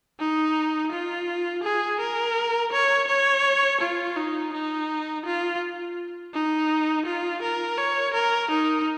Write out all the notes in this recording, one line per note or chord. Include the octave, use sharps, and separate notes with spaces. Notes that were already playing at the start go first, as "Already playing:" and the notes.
D#4
F4
G#4
A#4
C#5
C#5
F4
D#4
D#4
F4
D#4
F4
A#4
C#5
A#4
D#4